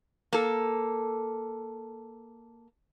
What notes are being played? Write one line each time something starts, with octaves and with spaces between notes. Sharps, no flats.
A#3 A4